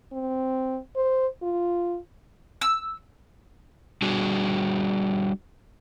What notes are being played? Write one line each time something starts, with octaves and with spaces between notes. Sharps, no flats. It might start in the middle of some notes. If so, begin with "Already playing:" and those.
C4
C5
F4
E6
G3 D4 F#4 G#4